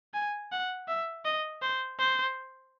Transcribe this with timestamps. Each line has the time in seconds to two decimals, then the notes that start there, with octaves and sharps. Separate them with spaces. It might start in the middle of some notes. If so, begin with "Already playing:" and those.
0.14 G#5
0.52 F#5
0.88 E5
1.25 D#5
1.62 C5
1.99 C5